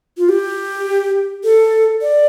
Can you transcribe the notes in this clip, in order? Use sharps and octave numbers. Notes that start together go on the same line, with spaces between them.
F4
G4
A4
D5